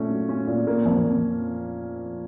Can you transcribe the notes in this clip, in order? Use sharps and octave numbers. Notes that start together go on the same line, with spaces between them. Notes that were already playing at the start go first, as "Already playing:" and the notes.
Already playing: A#2 A3 C#4
F#3
C#4
A#2
A#3
F2
F2